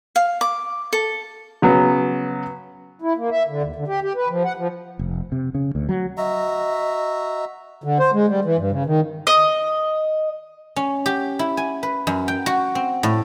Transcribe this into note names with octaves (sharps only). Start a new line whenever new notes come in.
F5
D6
A4
C#3 F#3 B3
E4
A#3
E5
D3
D#2
D3
G4
G4
B4
F3
F#5
F3
F1
C3
C#3
D2
F#3
F#4 D#5 E5 A#5
D3
C5
G#3
G3
E3
G2
C#3
D#3
D#5
C#4
G4
E4
G#5
B4
F#2
G5
F#4
C4
A2